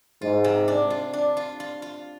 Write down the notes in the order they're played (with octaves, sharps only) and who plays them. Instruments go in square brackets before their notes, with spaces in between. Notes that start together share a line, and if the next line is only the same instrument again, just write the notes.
[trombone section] G#2 [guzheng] F4
[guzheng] C3
D4
F4
D4
F4
F4
F4